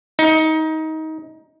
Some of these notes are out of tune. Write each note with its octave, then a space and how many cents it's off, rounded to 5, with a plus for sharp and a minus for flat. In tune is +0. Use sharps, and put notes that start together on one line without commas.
D#4 +20